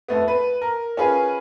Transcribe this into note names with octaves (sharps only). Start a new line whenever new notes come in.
F2 A3 B3
B4
A#4
C#4 F4 G#4 B4